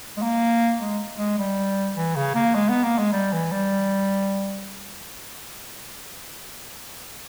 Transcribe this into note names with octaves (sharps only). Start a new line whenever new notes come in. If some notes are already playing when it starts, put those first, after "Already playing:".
G#3
A#3
G#3
G#3
G3
E3
C#3
A#3
G#3
B3
A#3
G#3
G3
E3
G3